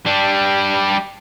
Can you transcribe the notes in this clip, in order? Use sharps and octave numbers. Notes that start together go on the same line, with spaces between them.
G3 D4